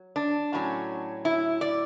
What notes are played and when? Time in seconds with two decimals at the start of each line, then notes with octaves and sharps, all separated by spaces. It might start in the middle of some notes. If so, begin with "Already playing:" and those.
Already playing: F#3
0.16 D4
0.53 A2 F#3 C#4
1.25 E4
1.61 D5